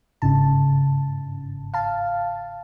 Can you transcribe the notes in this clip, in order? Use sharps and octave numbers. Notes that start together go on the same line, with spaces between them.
G1 G#2 C#3 A5
F5 A5